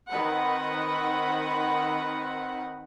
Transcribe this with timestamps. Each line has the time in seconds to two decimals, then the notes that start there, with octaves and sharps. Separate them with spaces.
0.11 D#3 C4 B4 F#5 B5